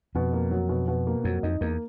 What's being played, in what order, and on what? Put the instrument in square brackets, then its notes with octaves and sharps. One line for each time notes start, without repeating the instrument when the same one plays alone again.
[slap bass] F2 [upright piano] B2
[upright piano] A#3
F#3
B2
B2
A#3
[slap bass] F2 [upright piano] F#3
[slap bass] F2 [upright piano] D#4
[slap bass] E2 [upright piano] A#3